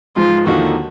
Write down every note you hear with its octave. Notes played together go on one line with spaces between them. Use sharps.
G#2 F3 G#3 F4
D#2 D3 F3 A#3 D#4 F#4